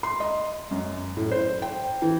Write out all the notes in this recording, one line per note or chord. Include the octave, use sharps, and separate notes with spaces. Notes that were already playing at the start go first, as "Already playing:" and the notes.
C6
D#5
F#2
A2
C5
G5
E3